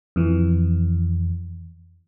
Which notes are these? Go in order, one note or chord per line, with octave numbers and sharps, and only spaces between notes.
F2 E3